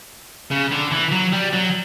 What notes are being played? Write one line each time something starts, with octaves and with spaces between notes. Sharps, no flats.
C#3
D3
E3
F#3
G3
F#3